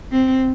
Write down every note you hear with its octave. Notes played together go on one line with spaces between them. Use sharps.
C4